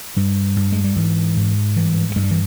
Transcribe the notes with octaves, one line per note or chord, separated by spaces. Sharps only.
G2 G3
G2
G#3
G3
G#2 E3
G#2
G2 E3
G2 G#3
G3
E3